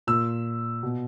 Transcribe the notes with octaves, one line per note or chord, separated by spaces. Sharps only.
A#2 E6
B2